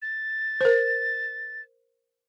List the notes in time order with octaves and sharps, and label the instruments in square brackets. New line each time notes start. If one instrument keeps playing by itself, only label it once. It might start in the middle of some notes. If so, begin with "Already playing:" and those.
[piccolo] A6
[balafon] A#4 C5